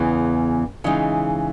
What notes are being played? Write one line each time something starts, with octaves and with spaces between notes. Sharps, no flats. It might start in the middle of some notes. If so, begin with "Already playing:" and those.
Already playing: E2 C#3 E3 B3
C#3 E3 G#3 D#4